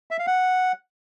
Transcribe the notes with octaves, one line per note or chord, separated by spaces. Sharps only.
E5
F5
F#5